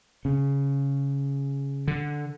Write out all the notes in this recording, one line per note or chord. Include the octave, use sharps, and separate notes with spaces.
C#3
D3